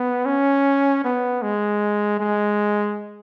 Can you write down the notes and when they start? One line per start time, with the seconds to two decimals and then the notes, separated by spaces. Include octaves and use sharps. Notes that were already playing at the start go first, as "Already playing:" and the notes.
Already playing: B3
0.26 C#4
1.05 B3
1.43 G#3
2.20 G#3